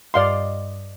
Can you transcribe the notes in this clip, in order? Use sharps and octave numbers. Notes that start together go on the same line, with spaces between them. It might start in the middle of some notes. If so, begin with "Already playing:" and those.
G2 D5 D#5 F5 C6